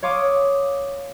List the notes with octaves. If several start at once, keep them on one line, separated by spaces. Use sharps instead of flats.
C#5 F5 C6 D6 D#6